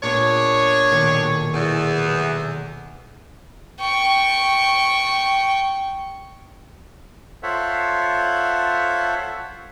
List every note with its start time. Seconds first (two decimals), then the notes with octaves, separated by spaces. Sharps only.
0.03 A#2 B3 D4 G#4 C#5
0.91 B1 A#2 D#3
1.54 E2
2.05 B1
3.80 G5 C#6
7.43 F4 A4 C5 C#5 E5 F#5